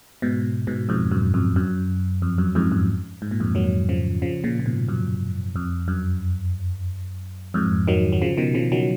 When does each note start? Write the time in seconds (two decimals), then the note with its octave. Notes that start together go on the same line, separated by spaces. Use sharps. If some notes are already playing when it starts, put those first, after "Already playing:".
0.22 G#2 B2
0.67 G#2 B2
0.89 F2 G#2
1.12 F#2
1.34 F2
1.56 F#2
2.22 F2
2.38 F#2
2.55 F2 G#2
2.72 F#2
3.22 G#2
3.31 A#2
3.40 F2 G#2
3.55 D#3 F#3
3.89 C#3 F3
4.22 C#3 F3
4.44 A#2 C#3
4.60 A#2
4.66 G#2 B2
4.88 F#2
5.56 F2
5.88 F#2
7.54 F2 G#2
7.88 D#3 F#3
8.12 F#3
8.22 C#3 F3
8.37 B2 D#3
8.55 C#3 F3
8.72 D#3 F#3